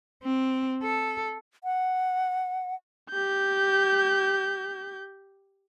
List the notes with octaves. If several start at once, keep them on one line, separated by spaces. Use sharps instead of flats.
C4
A4
F#5
G4 G6